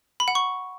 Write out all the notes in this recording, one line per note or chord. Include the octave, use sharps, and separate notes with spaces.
B5
F#5
C#6